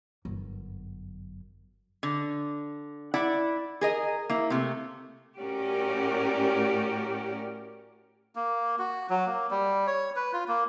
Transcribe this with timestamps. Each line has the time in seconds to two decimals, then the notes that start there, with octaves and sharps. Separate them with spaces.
0.25 G1 F#2
2.03 D3
3.14 E4 D5 F#5
3.81 G#4 A#4 D#5
4.29 A#3 E4
4.50 C3 A3
5.39 A2 C#4 F#4 G4 A#4 D5
8.36 A#3
8.79 F#4
9.10 F#3
9.26 A#3
9.51 G3
9.87 C#5
10.16 B4
10.33 F4
10.48 A#3